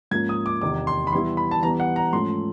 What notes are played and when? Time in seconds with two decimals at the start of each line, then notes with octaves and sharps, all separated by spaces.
0.11 G#2 F3 A#3 C#4 F4 G#6
0.29 D#6
0.46 D6
0.61 E2 C3 D#3 D6
0.87 C6
1.07 B5
1.12 E3 G3 B3 E4 C6
1.37 B5
1.51 A5
1.62 E3 G3 B3 A#5
1.80 F#5
1.96 A#5
2.13 G#2 F3 A3 C#4 C6